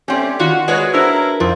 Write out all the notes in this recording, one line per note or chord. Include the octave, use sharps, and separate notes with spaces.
G3 A3 C4 C#4
D#3 F4 F#4
G#3 F#4 G#4 B4 C#5 D5 C#6
D4 E4 A#4 C5 A5
F2 F3 F4 A#4